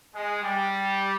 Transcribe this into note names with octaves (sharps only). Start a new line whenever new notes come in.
G#3
G3